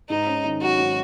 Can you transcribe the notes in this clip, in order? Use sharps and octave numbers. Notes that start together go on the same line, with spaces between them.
G#2 D#4
C#4
D#3
F#3 F#4
G#2